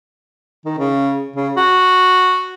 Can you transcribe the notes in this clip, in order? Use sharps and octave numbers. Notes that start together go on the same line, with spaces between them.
D#3
C#3
C#3
F#4